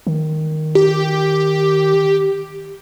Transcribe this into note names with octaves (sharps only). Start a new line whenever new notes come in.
D#3
G4